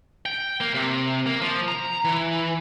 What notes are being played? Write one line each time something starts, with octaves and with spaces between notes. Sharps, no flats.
G5
A#3
C3
A#3
F3
A#5
E3